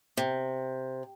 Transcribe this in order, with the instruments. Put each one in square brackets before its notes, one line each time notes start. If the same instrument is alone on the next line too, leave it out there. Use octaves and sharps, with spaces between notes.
[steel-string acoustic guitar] C3